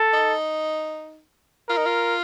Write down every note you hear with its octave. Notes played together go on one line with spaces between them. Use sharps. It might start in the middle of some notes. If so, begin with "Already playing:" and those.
Already playing: A4
D#4
F4 A#4
D#4
F4